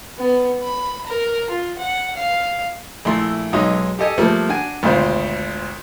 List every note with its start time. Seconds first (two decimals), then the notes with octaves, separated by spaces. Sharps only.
0.18 B3
0.64 B5
1.06 A#4
1.49 F4
1.78 F#5
2.16 F5
3.05 A#1 A3 E4 C6
3.53 B1 F#3 G#3 D#4 D#6
3.99 G4 A4 D#5 G#5
4.18 F3 G3 A3 A#3
4.49 D4 F#4 G#5
4.83 G#1 D2 B2 F4 C5 C6